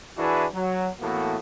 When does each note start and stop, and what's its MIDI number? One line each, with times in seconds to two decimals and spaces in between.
0.18 0.46 52
0.18 0.46 62
0.18 0.46 64
0.18 0.46 66
0.18 0.46 68
0.18 0.46 71
0.54 0.89 54
1.01 1.38 45
1.01 1.38 52
1.01 1.38 58
1.01 1.38 59
1.01 1.38 66
1.01 1.38 69